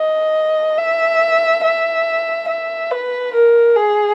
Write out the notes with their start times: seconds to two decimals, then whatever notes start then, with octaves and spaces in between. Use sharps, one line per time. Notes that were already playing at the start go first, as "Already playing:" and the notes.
Already playing: D#5
0.78 E5
1.63 E5
2.48 E5
2.91 B4
3.33 A#4
3.76 G#4